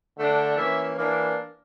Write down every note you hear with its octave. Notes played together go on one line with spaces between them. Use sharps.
D3 A3 D4
E3 A#3 C#4 E5
E3 A#3 D4